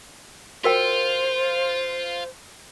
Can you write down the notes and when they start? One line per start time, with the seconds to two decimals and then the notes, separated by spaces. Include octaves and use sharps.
0.64 F4 F#4 A#4 C5 G5